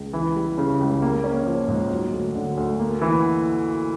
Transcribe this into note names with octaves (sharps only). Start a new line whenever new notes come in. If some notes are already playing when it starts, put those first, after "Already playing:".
Already playing: C#2
E3
G3
C#3
C#2
A#3
C#4
F3
G#2
F#3
D2
D3
D2
A#3
E3